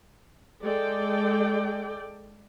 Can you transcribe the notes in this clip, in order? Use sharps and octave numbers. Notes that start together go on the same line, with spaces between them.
G#3 A4 D5 G5